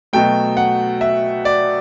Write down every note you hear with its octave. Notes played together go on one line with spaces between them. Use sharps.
B2 F#3 A3 G5
F#5
E5
D5